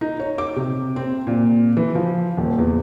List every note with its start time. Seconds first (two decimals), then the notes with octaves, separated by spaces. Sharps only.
0.01 D#4
0.20 C#5
0.38 D6
0.56 C3
0.96 C4
1.27 A#2
1.77 E3
1.95 F3
2.37 D#1
2.58 E2